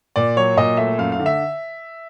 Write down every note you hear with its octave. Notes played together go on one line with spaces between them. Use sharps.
A#2 D5
F#3 C#5
A#2 D#5
A3 E5
F#2 F5
F5
D3
E5